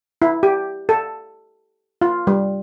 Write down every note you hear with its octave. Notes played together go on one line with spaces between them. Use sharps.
E4
G4
A4
F4
G3